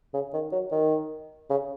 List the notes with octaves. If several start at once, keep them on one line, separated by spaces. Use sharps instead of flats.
C#3
D#3
F#3
D#3
C#3